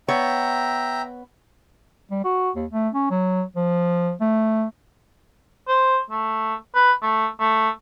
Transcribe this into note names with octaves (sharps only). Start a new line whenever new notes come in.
B3 C#5 E5 G5 A#5
G3
F#4
D#2
A3
C#4
F#3
F3
A3
C5
A3
B4
A3
A3